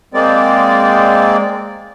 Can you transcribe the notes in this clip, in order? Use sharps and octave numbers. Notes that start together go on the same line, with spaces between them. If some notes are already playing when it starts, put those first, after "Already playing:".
G#3 A#3 C4 D5